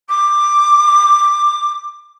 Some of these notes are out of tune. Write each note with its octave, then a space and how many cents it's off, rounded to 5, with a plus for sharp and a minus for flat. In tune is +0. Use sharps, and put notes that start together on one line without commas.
D6 +10